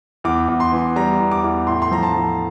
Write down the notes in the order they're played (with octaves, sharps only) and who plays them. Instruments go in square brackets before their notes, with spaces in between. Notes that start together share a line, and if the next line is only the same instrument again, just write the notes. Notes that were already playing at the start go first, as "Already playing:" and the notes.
[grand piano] E2 D6
E2
C6
E3
G3 A#5
E2
D6
E2
A2 C6
C6
F3 A#5
A5
F3